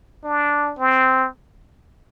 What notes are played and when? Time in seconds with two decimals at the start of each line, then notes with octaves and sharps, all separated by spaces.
0.24 D4
0.79 C4